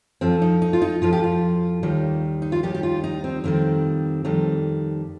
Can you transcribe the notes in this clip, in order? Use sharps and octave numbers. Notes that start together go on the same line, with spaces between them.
F2 F3 C4
D#4
D#4
F4
D#4
F2 F3 F4
G4
F4
D#2 D#3 G3
D#4
F4
D#2 D#3 G3 G4
G4
F4
D#4
C4
F2 D#3 G3 C4
F2 D#3 G3